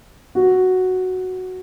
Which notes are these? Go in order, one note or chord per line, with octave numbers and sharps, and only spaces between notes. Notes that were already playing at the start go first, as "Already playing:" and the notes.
F#4